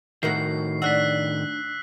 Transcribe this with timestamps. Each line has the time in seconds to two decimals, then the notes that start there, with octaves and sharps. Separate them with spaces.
0.23 A2 D#3 F#4 A#4 E5 C7
0.82 D4 F#4 E6 F#6 B6